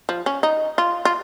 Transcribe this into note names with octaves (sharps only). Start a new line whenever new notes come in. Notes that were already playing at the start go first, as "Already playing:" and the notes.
F3
C#4
D#4
F4
F4